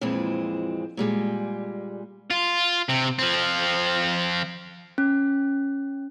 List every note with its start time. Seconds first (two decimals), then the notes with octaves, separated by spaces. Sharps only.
0.01 F2 A#2 E3 G#3 C4
0.97 A#2 G3 G#3
2.30 F4
2.89 C3
3.19 F3 C4
4.98 C#4